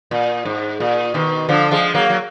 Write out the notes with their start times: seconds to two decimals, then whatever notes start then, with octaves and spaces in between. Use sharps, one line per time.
0.11 A#2
0.45 G#2
0.80 A#2
1.14 B2 D#3
1.49 D3 F3
1.71 F3 G#3
1.95 F#3 A#3
2.10 F#3